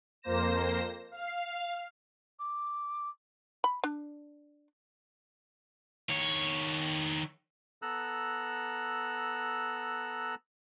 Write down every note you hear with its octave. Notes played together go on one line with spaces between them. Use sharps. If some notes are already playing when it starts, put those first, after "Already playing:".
F2 A#3 C5 A#6 E7
F5
D6
B5
D4
D#3 C#5
B3 A4 A#5 E6 F#6